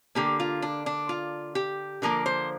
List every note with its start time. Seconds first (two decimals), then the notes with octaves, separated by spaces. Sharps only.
0.15 D3 A#3 G4
0.40 F4
0.62 D4
0.86 D4
1.09 F4
1.55 G4
2.02 D3 F3 A#3 A#4
2.26 C5